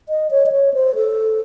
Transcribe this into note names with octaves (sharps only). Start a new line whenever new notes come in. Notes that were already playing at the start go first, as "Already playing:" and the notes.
D#5
C#5
D#5
C#5
C5
A4